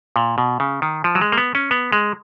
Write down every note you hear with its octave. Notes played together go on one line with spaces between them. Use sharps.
A#2
B2
C#3
D#3
F3
F#3
G#3
A#3
B3
C#4
B3
G#3